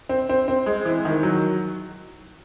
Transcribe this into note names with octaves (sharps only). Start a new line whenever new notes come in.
C4
C4
C4
G#3
E3
D#3
F#3